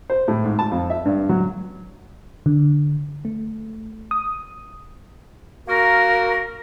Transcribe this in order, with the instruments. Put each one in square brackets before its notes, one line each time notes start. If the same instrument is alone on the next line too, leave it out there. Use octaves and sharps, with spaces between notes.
[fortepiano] C5
A2
G#2
A5
F2
E5
G2
F#3
[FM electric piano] D3
A3
D#6
[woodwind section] A#3 F#4 A#4